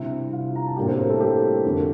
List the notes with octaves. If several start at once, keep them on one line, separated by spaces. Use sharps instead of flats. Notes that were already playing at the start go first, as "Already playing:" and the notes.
Already playing: C3 G3 D4 E4 E5
F4 F5
A#5
A5
A2 G3 A#3 D4 G4 G5
C4 C5
A#3 A#4
A3 A4
G3 G4
F2 D3 A3